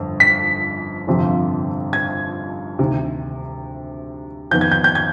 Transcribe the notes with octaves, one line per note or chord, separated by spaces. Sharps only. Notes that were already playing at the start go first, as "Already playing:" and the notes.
Already playing: G1 F2
B6
G1 F2 C3 F3 C4
G#6
D2 C3 D#3
F2 D#3 B3 G6
G#6
G6
G6
G#6